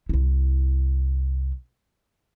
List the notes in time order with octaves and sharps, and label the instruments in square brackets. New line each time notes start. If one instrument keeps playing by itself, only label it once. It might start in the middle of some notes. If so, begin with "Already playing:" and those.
[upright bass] C2 E4